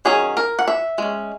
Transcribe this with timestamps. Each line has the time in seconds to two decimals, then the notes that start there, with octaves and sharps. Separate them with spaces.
0.05 D#3 F#3 C#4 G#4
0.37 A#4
0.59 F#5
0.68 E5
0.98 G#3 C#4